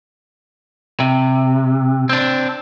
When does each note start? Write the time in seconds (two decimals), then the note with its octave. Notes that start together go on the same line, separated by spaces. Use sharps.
1.00 C3
2.09 C4 D4